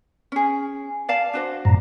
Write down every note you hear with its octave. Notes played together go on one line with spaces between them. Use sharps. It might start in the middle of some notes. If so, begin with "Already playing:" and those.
C#4 G#4
D5 F5 A5
D4 F#4 C5
F#2 A2 A#5